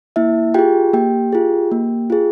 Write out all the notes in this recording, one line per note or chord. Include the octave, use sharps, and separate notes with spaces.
A#3 E4 E5
F4 G4 G#4 G5
A#3 G4 G5
F4 G#4
A#3
F4 G#4